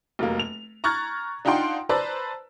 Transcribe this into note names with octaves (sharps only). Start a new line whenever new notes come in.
F1 F#3 A#3
F7
A#5 C#6 F6 F#6 G#6 A6
D4 D#4 F4 F#5 G5 C6
B4 C5 D5 A5 A#5 E6